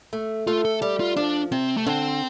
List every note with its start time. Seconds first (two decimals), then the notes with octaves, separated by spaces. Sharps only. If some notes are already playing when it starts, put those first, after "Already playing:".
0.13 A3
0.47 A3 F4
0.65 A4
0.82 G3 G4
1.00 F4
1.17 F3 D4
1.52 C3 C4
1.77 A3
1.86 D3 C4